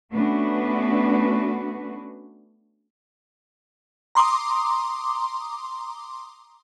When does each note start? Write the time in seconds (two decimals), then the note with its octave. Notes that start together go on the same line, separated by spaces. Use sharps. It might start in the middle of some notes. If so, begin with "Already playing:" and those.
0.12 A3 B3 C#4 D4 F#4 B4
4.15 A#5 C6 D6 D#6